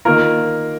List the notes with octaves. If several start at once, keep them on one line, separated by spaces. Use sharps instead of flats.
D#3 A#3 F4 A#4